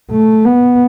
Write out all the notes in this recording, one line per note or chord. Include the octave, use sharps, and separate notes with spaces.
A3
B3